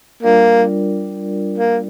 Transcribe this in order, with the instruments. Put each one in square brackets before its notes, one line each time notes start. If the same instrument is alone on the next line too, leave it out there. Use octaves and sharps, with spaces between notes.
[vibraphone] G3 D4 F4 A#4 D5 [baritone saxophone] A#3
[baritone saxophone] A#3